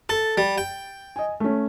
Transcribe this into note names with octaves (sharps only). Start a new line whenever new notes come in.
A4 A6
G3
G5
D#5 G#5
A3 C#4